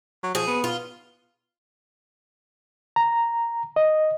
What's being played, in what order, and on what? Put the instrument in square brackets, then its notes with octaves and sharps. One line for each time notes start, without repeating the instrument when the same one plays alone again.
[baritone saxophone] F#3
[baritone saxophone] F3 [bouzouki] G#4
[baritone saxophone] B3
[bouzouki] F4
[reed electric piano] A#5
D#5